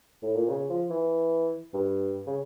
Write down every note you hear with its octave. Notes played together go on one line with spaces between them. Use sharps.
A2
A#2
C#3
F3
E3
G2
C#3